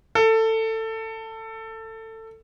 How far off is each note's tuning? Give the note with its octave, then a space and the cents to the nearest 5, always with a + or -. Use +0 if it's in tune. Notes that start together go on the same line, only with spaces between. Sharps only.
A4 +20